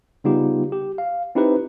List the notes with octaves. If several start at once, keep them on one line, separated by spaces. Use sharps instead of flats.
C#3 G3 B3 D#4 F4 G4
G4
F5
C4 D#4 E4 G4 B4 C5